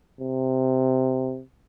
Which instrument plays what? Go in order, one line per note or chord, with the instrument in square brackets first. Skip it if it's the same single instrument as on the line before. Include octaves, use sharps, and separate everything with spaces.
[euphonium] C3